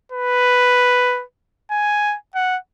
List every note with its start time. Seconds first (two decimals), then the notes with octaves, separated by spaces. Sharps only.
0.12 B4
1.71 G#5
2.35 F#5